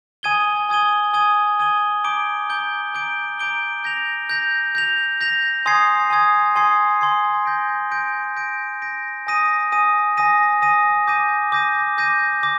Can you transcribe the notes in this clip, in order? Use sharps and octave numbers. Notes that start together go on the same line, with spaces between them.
G#5 D#6 G#6 D#7 G7
G#5 D#6 G#6 D#7 G7
G#5 D#6 G#6 D#7 G7
G#5 D#6 G#6 D#7 G7
A#5 D6 G6 D7 G7
A#5 D6 G6 D7 G7
A#5 D6 G6 D7 G7
A#5 D6 G6 D7 G7
G6 A#6 F7
G6 A#6 F7
G6 A#6 F7
G6 A#6 F7
G#5 C6 D#6 G#6 C7
G#5 C6 D#6 G#6 C7
G#5 C6 D#6 G#6 C7
G#5 C6 D#6 G#6 C7
G6 A#6 D7
G6 A#6 D7
G6 A#6 D7
G6 A#6 D7
G#5 D#6 A#6 D#7
G#5 D#6 A#6 D#7
G#5 D#6 A#6 D#7
G#5 D#6 A#6 D#7
D6 G6 A#6 D#7
D6 G6 A#6 D#7
D6 G6 A#6 D#7
D6 G6 A#6